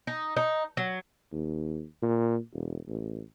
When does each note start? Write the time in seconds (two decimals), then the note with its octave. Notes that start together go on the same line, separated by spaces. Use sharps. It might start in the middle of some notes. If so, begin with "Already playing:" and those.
0.07 D#4
0.37 D#4
0.77 F#3
1.32 D#2
2.02 A#2
2.54 E1
2.88 A1